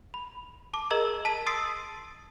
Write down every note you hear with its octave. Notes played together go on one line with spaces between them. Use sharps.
B5
A5 D6
G#4 A#4 D#5 A#5 E6 G#6
A5 B6 D#7
C6 D#6 E6 A6 C7 D7